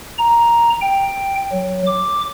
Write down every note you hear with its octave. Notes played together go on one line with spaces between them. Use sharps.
A#5
G5
F#3
D6